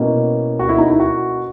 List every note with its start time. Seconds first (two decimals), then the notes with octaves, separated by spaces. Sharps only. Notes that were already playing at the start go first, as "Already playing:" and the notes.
Already playing: B2 A#3 C#4 E4
0.59 F#4
0.69 E4
0.78 D#4
0.88 E4
1.00 F#4